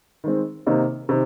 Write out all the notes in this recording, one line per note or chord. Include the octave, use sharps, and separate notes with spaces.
D#3 G#3 C4
C3 D#3 A#3 D#4
C3 D#3